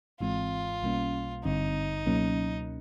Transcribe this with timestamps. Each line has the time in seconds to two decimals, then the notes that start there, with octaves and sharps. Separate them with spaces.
0.21 G#1 G#2 E3 G#3 C4 F4
0.82 B1 B2 G3 A#3 C#4
1.45 G#1 G2 D3 G3 C4 D#4
2.06 C#2 B2 F#3 A#3 C#4